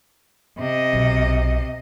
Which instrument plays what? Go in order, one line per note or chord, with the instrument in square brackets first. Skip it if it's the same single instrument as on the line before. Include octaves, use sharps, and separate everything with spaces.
[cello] C3 D#5
[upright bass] B1